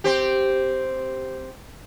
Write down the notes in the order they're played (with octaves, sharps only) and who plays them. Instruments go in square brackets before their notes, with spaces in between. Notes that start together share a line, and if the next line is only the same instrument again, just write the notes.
[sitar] C4 G4